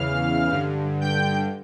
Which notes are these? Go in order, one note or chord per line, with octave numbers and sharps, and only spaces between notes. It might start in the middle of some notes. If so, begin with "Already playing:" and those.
Already playing: E2 C#3 E3 F5 F6
G2 D3
G5 G6